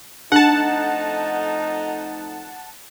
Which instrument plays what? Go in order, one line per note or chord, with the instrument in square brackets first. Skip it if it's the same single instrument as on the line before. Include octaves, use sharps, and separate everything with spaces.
[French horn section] F2 A3 D#4 [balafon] D4 [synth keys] F#5 A5